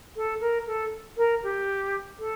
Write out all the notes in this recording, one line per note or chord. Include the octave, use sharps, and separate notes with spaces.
A4
A#4
A4
A#4
G4
A4